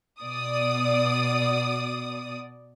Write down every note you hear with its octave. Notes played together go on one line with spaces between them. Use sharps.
B2 D5 D#6